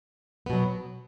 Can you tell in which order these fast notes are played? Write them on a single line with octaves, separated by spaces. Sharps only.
B3 B2 F#3